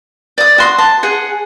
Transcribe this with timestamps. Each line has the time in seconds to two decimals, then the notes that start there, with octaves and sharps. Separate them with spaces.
0.38 D5 D#6
0.58 F#4 C6 D#6
0.78 A5
1.03 G#4 F#5